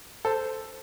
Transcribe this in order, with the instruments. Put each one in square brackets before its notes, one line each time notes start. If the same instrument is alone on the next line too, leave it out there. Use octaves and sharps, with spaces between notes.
[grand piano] A4 [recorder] C5